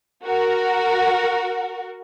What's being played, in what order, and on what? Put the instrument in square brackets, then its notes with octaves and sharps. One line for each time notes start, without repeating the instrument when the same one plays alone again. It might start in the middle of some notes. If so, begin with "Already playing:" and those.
[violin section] F#4 A#4